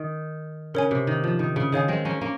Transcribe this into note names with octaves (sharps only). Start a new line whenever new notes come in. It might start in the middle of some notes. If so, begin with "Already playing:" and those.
Already playing: D#3 D#5
C#3 A#4 C#5 G#5
C3
D#3
F3
D#3
C#3
D#3 G#4 C#5 F5 G#5
G#3 C4
A#3 C#4
A#3 C#4